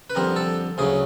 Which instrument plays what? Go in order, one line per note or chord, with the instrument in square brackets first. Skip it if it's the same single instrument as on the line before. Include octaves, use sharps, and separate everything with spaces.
[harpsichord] B4
F2 D3 G3 C4 A#4
A4
D2 C#3 F#3 G#4